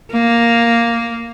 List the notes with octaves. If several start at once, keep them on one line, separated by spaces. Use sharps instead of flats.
A#3